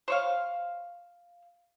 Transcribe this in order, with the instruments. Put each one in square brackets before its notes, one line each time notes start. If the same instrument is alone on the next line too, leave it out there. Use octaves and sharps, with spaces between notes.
[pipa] C5 C#5 F5